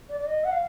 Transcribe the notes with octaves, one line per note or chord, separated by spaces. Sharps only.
D5
D5
D#5
F#5
F5